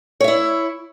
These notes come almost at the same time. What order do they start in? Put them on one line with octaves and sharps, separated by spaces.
C#5 E5 E4